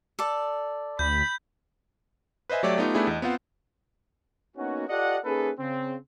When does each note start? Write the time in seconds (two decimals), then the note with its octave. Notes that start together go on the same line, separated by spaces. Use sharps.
0.19 A4 D5
0.99 D2 B5 G6
2.50 B4 C5 D#5 E5 G#5
2.63 F#3 A3 G4 C#5 D5 E5
2.78 A3 B3 D#4 F4 G4
2.95 A3 B3 D4 E4 G4 G#4
3.07 E2 D#5
3.22 B3 C4 F4 C5 F#5
4.56 A#3 B3 C#4 D#4 F#4
4.88 F4 G4 A4 D5 D#5 F#5
5.24 A#3 C#4 D#4 G#4 A4 B4
5.58 C#3 C4